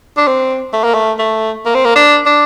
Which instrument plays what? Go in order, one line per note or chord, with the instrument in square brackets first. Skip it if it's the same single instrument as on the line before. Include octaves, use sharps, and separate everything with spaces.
[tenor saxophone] D4
C4
A3
A#3
A3
A3
A#3
C4
A#3
D4
D4